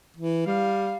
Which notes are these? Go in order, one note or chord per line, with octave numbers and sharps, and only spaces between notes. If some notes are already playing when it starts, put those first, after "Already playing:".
E3
G3 F5